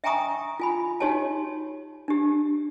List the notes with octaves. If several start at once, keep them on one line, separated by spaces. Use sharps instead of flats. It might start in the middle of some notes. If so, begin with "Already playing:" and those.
E5 G5 G#5 A#5 C#6 D#6
F4 G#5 B5
D#4 F#4 G4 C#5 G#5 A5
D4 G4